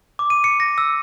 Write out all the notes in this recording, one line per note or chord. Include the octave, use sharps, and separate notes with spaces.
D6
D#7
C#7
A#6
E6